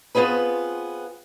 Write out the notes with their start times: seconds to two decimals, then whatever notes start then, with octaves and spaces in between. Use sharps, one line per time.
0.15 B3 C4 F4 G#4 B4